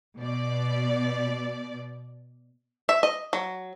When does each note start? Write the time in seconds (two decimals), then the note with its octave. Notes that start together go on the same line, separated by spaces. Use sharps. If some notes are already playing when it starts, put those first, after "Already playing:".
0.19 B2 D5
2.89 E5
3.03 D#5
3.33 F#3